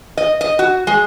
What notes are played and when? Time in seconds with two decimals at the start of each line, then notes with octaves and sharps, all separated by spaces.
0.17 D#5
0.41 D#5
0.59 F#4
0.87 G#3